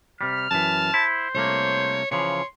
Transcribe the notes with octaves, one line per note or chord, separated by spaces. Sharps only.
C3 G3 F6
F#2 E3 A5
E4 C5
C2 A3 A#3 C#5
C#3 E3 F3 C#5 C6